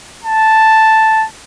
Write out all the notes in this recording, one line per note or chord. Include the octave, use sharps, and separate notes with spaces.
A5